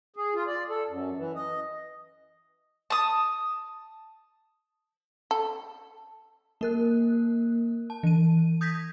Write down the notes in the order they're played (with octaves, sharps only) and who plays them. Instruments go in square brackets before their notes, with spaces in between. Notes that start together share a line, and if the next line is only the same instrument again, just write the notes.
[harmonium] G#4
F4
D5
A4
F#2
E3
D#5
[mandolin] A5 D#6
[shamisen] A4
[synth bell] A#3 A#4 F#6
A5
E3 D#7
D#6 G6 G#6 A#6 B6